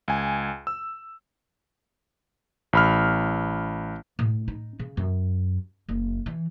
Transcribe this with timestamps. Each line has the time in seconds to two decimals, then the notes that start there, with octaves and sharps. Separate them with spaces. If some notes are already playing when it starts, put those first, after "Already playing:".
0.08 C#2 G#5
0.67 E6
2.73 A1 B5 F6
4.19 A2
4.48 D#4
4.79 C#3
4.97 F#2
5.89 F#1
6.26 E3